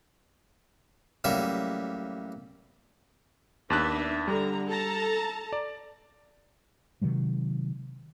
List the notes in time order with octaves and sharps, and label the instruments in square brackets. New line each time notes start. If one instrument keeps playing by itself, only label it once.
[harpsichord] A1 F#3 G3 A#3 E5
[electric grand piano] D#2 A5 F#6 [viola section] B3 D4 E5
[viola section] D3 A#5 [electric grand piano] G3
[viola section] A4 A5 A#5
[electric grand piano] D5
[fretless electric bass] C3 D#3 F#3 G#3